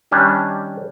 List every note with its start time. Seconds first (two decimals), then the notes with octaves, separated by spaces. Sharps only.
0.11 D#3 G3 C#4 D4